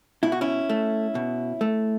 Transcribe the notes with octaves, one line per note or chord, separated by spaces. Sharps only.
B2 E4
F#4
C#4 E4
A3
B2
A3